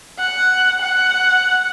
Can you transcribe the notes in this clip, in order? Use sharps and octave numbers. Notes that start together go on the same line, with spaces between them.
F#5
F#5